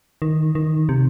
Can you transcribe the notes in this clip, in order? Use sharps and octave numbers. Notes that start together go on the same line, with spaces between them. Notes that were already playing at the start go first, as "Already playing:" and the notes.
D#3
D#3
C3